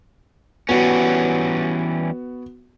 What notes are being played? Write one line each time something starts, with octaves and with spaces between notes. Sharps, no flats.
E3 G3 B3 C#4 F#4